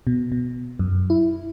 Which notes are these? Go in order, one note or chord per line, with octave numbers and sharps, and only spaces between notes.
B2
B2
F#2
E4